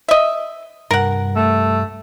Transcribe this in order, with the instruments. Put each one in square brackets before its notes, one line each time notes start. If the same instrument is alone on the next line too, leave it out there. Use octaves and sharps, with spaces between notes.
[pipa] D#5 E5
[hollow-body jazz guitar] C2 G2 [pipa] A#4 F#5
[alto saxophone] A3